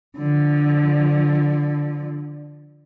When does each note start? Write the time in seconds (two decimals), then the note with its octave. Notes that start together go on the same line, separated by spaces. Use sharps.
0.17 D3 F3